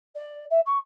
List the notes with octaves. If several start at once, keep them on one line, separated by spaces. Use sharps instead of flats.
D5
E5
C#6